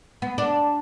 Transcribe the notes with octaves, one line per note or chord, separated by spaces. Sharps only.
B3
D4